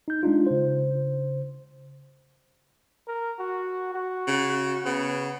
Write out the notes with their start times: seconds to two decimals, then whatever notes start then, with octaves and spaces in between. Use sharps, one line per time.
0.08 D#4 G6
0.23 G#3 D4 D#4 F4
0.47 C#3 C5
3.08 A#4
3.39 F#4
3.94 F#4
4.27 C#3
4.85 C#3 B3